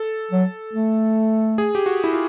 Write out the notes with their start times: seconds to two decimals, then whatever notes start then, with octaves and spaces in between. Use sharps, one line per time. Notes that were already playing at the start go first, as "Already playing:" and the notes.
Already playing: A4
0.31 F#3
0.73 A3
1.58 G#4
1.75 G4
1.86 F#4
2.04 E4
2.13 F4